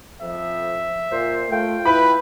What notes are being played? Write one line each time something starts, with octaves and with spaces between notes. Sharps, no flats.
F2 F3 E5
A#2 C5
A3 F4 G5
E4 B4 B5